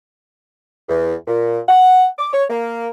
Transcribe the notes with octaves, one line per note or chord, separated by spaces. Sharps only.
E2
A#2
F#5
D6
C#5
A#3